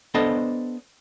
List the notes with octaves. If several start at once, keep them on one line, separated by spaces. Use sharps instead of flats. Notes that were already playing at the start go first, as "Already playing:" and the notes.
B3 D4 A4 C5 D#5